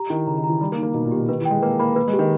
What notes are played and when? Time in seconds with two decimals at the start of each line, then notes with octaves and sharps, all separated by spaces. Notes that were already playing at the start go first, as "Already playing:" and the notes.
Already playing: G4 A#5
0.10 D#3 E4
0.27 C#3 A#5
0.38 D#3
0.44 A#5
0.49 E3
0.60 G3 D#4
0.72 A#3
0.78 D#4
0.83 A#3
0.94 B2 D#4
1.05 A#2
1.12 G4
1.18 B2
1.29 D#3 B4
1.40 E3
1.45 G5
1.51 G#3
1.62 A#3 B4
1.79 A#3 B5
1.96 A#3 B4
2.08 G#3
2.13 G4
2.19 D#3